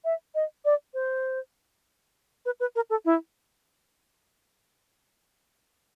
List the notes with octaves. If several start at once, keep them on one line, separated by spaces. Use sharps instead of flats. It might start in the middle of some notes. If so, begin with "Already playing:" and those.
E5
D#5
D5
C5
B4
B4
A#4
A4
E4